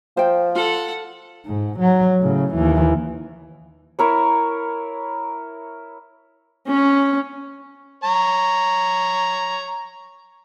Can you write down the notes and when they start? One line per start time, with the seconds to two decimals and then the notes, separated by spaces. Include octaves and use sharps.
0.17 F3 C5 G5
0.55 F4 A4 F#5
1.46 G#2
1.79 F#3
2.19 A2 C#3
2.54 D#2 E3
3.99 E4 A#4 C#5
6.68 C#4
8.04 C#5 A#5